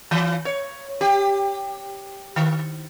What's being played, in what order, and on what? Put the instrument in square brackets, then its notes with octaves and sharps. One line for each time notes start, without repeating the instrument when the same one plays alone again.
[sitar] E3
C#5
G4
D#3